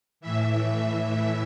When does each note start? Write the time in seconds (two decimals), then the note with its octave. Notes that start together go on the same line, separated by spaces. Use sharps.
0.21 A2 E3 E5
0.89 A2 E3